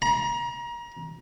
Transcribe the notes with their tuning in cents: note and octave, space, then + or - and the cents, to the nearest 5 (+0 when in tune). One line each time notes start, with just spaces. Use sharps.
A#5 +30